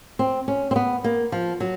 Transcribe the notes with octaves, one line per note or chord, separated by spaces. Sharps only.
C4
C#4
C4
B3
A#3
F3
F#3